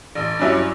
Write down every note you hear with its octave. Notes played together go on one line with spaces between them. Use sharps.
A1
G2 F#3 C#4 E4